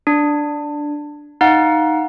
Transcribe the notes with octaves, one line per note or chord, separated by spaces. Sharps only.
D4
D#4 F5 F#5